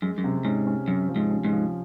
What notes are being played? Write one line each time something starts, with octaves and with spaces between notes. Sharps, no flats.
F#2 G#3
F#2
C3
G#2 C#4
C#4
F#2 C3
F3
G#2
C#4
G#2
F3